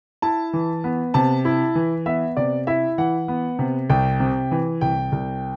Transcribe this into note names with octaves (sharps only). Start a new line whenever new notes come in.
E4 A5
E3
B3
C3 A5
E4
E3
B3 E5
C3 D5
E4 E5
E3 F#5
B3
C3
C2 G5
C3
E3
C2 G5
C2